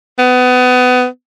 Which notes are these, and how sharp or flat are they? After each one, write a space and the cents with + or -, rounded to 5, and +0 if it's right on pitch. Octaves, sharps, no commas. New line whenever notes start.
B3 +25